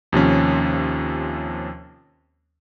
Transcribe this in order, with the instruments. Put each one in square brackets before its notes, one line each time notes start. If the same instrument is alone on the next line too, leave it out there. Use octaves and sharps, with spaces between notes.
[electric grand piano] D#2 C3 F3 C#4